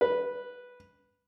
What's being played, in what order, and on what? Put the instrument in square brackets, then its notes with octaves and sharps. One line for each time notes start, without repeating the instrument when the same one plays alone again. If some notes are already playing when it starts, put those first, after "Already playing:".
[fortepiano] B4